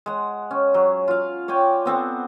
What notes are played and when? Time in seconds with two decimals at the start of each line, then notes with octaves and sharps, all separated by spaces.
0.06 G#3 F#5
0.51 C#4
0.74 F#3
1.08 F4 F5
1.48 C#5 D5 G5 G#5
1.86 B3 C4 A4 F#5